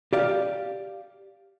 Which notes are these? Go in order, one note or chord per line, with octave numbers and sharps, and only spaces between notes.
G4 D5 F5